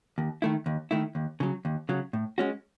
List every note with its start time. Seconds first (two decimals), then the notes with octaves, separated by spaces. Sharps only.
0.18 D#2
0.42 D#3 A3 E4
0.66 D#2
0.91 D#3 A3 E4
1.15 D#2
1.40 C#3 F#3
1.65 D#2
1.89 C#3 F#3
2.13 A2
2.38 G#3 C#4 F#4